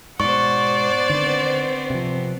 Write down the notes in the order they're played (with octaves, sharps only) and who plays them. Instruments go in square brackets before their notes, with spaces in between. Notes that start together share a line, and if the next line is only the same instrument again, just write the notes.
[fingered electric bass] G#2 B2 [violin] C5 D5 [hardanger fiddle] F#5 [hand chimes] C#6
[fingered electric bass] D3 D#3 [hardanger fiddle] B3 C4
[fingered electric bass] C3 F3